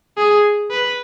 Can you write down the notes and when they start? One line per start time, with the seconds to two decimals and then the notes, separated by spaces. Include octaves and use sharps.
0.18 G#4
0.71 B4